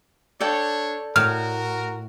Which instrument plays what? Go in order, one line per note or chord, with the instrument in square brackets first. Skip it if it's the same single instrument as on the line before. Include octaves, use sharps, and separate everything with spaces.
[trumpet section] D4 C#5 [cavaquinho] A4 D5 G5
[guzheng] A2 [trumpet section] F#4 A#4 [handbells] F6